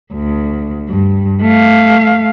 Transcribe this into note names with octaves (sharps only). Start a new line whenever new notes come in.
D2
G2
A3 F5